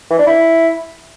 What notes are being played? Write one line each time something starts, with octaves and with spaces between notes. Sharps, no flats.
E3
D4
E4